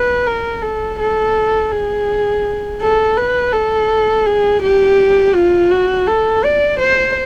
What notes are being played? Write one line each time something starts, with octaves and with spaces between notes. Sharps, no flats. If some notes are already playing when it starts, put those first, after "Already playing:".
Already playing: B4
A#4
A4
A4
G#4
A4
B4
A4
G#4
G4
F4
F#4
A4
D5
C5